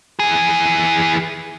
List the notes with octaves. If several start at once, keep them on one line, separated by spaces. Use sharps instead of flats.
E3 G#4